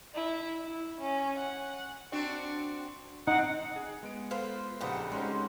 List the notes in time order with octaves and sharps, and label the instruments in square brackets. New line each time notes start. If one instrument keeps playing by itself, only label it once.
[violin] E4
E4
C#4
F#5
[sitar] C4 D4 F#4
[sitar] C4 [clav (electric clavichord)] D#4 [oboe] F#5
[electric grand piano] G#4
G#3 B3 D7
[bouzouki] F4 B4 C5 [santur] A4
[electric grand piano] A#1 G5 [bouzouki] C#3 D4 F#5 [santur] D#4 G4 B4
[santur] G3 C4 C5 [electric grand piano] G#3 C#4 D#4 [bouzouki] F#4